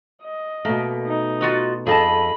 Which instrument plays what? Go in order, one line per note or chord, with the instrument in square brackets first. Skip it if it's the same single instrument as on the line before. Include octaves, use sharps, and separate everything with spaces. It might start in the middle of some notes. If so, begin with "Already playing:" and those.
[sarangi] D#5
[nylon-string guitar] B2 A3 [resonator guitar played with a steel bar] A#3
[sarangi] D#4
[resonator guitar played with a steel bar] F4 F#4 D#5
[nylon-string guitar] F2 A4 [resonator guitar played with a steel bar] G#4 D#5 A5 [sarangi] B5